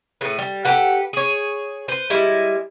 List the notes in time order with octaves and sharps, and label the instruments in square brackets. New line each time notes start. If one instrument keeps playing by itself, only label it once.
[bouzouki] A2 G#4 B4
G3
G4 A4 B4 F#5
G#4 C#5
B4 C5
G3 G#3 E4